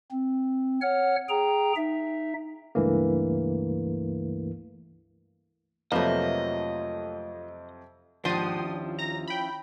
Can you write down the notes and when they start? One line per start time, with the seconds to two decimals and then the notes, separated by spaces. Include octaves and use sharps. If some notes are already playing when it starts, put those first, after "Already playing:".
0.11 C4
0.82 C#5 F#5 F6
1.29 G#4 G5 A#5
1.76 D#4 E5
2.75 C#2 G2 E3 A3 A#3
5.92 F2 C3 F3 F#3 A3 A#3 B4 D#5
8.25 D#2 G#2 F3 D4 F#5 G5 C6 D#6
8.62 C#4 E4 F4
8.99 A#5 A#6
9.28 G5 B5